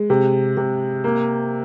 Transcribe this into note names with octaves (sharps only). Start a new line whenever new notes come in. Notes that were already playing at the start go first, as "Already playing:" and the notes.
Already playing: G#3
C3
C3
A#3